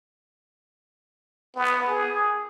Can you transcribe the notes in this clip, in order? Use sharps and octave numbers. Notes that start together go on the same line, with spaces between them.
B3
G#4